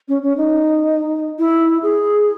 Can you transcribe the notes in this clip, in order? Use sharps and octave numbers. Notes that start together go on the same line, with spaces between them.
C#4
C#4
D#4
E4
G#4